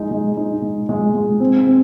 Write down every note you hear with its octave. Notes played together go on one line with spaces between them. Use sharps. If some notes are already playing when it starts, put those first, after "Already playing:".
Already playing: G#3 D#4
G#3
D#4
G#3
G#3
G#3
C4
C4